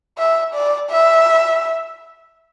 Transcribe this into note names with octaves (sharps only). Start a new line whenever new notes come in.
E5
D5
E5